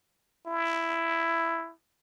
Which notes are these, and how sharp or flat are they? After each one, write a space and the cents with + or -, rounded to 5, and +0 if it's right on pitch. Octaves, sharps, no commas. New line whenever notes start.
E4 +10